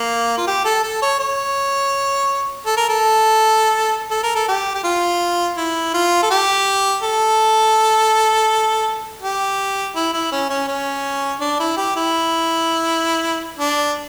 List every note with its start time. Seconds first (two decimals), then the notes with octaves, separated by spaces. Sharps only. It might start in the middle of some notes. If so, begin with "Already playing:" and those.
Already playing: A#3
0.37 F4
0.47 G4
0.65 A4
0.83 A4
1.02 C#5
1.19 C#5
2.66 A4
2.77 A#4
2.89 A4
4.11 A4
4.23 A#4
4.35 A4
4.48 G4
4.74 G4
4.84 F4
5.57 E4
5.94 F4
6.22 A4
6.30 G4
7.02 A4
9.22 G4
9.95 E4
10.13 E4
10.32 C#4
10.50 C#4
10.68 C#4
11.41 D4
11.59 E4
11.77 G4
11.96 E4
13.59 D4